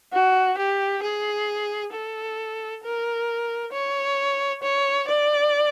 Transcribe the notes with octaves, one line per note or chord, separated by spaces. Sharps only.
F#4
G4
G#4
A4
A#4
C#5
C#5
D5